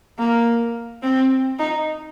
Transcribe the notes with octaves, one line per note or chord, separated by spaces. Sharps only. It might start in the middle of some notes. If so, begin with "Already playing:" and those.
A#3
C4
D#4